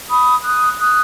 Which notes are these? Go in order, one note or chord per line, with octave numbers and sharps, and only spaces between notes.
B5 D#6
D#6 F#6
D#6 F#6